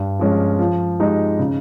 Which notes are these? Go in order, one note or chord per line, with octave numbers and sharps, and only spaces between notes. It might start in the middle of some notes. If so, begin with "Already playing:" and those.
Already playing: G2
F3 G#3 C#4 F4
F3
G#3 D#4 G4
C#3